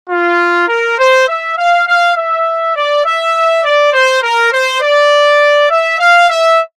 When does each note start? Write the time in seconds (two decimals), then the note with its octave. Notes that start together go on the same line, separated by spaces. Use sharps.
0.10 F4
0.68 A#4
0.99 C5
1.28 E5
1.57 F5
1.87 F5
2.16 E5
2.75 D5
3.05 E5
3.64 D5
3.93 C5
4.22 A#4
4.52 C5
4.81 D5
5.70 E5
6.00 F5
6.29 E5